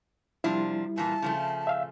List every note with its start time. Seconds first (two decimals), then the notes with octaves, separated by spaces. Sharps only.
0.44 C3 F3 G3 D4 E4
0.98 A#2 E3 A5
1.22 C#3 F3 A3
1.67 E5 F5 E6